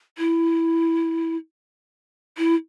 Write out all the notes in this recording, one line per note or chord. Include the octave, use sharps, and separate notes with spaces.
E4
E4